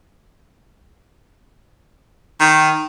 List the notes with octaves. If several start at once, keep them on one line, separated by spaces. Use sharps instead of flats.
D#3